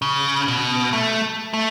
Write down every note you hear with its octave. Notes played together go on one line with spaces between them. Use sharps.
C#3
B2
A3
A3